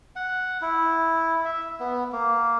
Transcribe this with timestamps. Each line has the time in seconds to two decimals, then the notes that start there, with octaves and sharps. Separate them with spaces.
0.16 F#5
0.62 E4
1.45 E5
1.80 B3
2.12 A#3